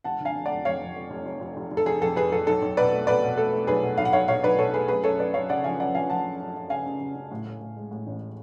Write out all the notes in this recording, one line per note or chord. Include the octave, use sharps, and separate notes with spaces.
F1 F#5 A5
D3
F5 G#5
F1
D5 F#5
F2
F2 C#5 F5
F2
F2
F1
F1
F1
F1
F1
A4
F1 G#4
F2 A4
F1 G#4 B4
F2 A4
B1 A4
B1
B2 B4 D5
A3
B2 B4 D5
B2
A3 A4
A3
B1 G#4 B4
B2
B1 F5
F#5
B1 C#5 F5
B2 C#5 F5
B1 B4 D5
B2 A4 C#5
A3 G#4 B4
F#2 G#4 B4
F#2 A4 C#5
F#2 B4 D5
F#2 C#5 F5
C#3 D5 F#5
F3 F5 G#5
F#2 D5 F#5
F3 F5 G#5
F3 F#5 A5
F#2
F#2
F#2
C#3 F5 G#5
C#3
C#3
C#3
A2
A2
A2
G#3
A2
A1